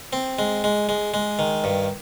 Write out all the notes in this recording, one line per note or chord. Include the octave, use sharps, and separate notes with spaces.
C4
G#3
G#3
G#3
G#3
D#3
G2